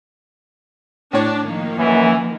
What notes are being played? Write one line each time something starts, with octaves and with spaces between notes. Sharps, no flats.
A2 D4 C#5
D#3 F3 A#3
F#2 E3